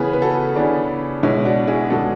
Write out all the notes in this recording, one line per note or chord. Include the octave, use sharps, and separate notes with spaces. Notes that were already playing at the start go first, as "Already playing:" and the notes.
Already playing: C#3 E3 B3 G#4 B4
B4
F#4 A4
C#3 E3 B3 D4
B2 G#3 B3 C#4 E4
D4 F#4
E4 G#4
B2 G#3 B3 F#4 A4